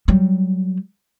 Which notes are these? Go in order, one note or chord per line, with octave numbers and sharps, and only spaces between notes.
F#3 G3